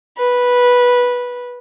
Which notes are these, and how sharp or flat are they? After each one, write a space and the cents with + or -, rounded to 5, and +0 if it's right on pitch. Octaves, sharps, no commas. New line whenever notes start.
B4 -10